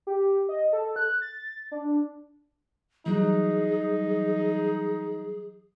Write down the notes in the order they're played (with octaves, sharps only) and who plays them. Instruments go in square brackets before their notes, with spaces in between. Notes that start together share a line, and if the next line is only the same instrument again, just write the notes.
[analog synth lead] G4
D#5
A4
F#6
A6
D4
[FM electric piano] E3 F#3 G3 [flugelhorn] D#4 [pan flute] G#4